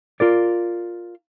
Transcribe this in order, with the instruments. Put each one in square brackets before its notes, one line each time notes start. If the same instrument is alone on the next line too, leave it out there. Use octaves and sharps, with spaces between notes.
[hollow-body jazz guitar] F4 A#4 D5